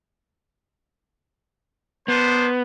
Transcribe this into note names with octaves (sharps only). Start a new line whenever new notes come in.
B3 D4 A#4 C5